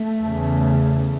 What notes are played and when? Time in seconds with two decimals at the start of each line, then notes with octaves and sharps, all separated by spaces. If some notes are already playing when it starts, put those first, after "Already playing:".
Already playing: A3
0.19 E2 C#3